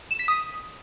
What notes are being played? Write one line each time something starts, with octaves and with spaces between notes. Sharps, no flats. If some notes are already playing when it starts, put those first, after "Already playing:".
E7
B6
D#6